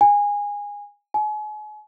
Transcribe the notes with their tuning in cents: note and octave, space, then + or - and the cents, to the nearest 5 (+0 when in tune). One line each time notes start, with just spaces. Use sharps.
G#5 -20
G#5 +40